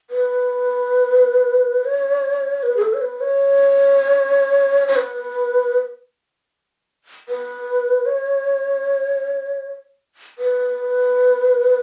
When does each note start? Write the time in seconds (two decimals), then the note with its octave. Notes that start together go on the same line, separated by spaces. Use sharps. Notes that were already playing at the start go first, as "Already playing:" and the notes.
0.10 B4
1.85 C#5
2.63 B4
2.77 G#4
2.82 A4
2.94 C#5
3.02 B4
3.21 C#5
4.88 C#5
4.96 B4
7.29 B4
8.06 C#5
10.39 B4